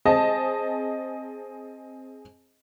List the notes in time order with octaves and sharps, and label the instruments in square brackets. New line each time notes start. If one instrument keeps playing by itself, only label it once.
[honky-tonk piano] C4 G#4 D#5 A5